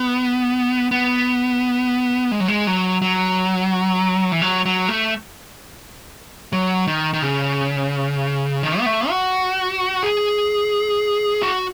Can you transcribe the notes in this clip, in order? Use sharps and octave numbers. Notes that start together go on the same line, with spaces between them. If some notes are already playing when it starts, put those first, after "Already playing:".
Already playing: B3
B3
G#3
F#3
G#3
F#3
F#3
E3
F#3
F#3
A3
F#3
D#3
D#3
C#3
D#3
B3
A3
F#4
G#4
F#4